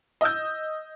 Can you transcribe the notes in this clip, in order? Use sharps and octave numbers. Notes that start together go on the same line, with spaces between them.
D#5 E6 G6